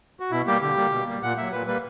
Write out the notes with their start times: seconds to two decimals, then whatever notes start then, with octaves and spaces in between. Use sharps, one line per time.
0.20 F#4
0.31 B2 E4
0.46 G3 A#3 G4
0.62 D3 G4
0.76 G3 A#3
0.92 B2
1.07 G3 A#3
1.23 A#2 F#5
1.37 F#3 A#3 E5
1.52 A#2 B4
1.67 G3 A#3 B4